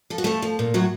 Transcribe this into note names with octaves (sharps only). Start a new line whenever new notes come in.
F3 A4
F#4
F3 A3 A4
F3
A#2
A2 F#3 F#4